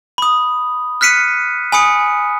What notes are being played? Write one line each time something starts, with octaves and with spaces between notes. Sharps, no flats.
B5 D#6
F6 F#6 B6 C#7 D#7
G#5 B5 D#6 C#7